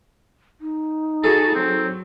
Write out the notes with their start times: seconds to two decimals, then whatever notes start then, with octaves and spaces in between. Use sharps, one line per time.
0.61 D#4
1.24 F#4 G#4 A4 A5
1.55 F#3 C4